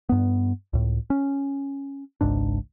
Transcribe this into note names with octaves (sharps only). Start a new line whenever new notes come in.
G2 B3
C#2 A2
C#4
G#1 C#2 G#2 D4